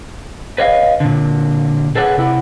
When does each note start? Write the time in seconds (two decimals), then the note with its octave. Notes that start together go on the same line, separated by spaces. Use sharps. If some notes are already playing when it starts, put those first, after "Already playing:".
0.58 B4 C#5 D#5 F5
1.00 A#2 D3
1.95 G#4 A4 B4 C#5 F#5
2.17 C3 E4 F#5